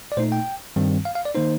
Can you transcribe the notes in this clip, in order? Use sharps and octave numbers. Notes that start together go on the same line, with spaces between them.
D5
A#2 A3 D#4 C5
G5
G2 D#3 G3 C4
F5
F5
D5
D#3 A#3 D#4 C5